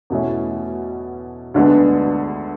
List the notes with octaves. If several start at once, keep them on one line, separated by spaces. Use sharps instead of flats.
E2 B2 A3 C#4 E4
D2 D3 G#3 B3 D4